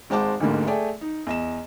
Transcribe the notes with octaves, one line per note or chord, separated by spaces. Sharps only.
G#1 G#3 C5 F#5 A5 D6
A1 D2 G#2 D3 A#3
A3 G#4 D5 G5 G#5
D#4
E2 D#5 E7